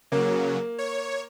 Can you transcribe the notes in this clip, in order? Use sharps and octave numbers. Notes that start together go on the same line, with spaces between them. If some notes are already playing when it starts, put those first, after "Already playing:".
C#3 F#3 A#3
C#5